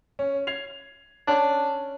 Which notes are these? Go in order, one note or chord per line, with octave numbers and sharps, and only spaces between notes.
C#4
G#6 C7 F7
C#4 D4